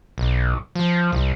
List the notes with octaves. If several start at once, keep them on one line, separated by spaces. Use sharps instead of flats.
B1
F3
C2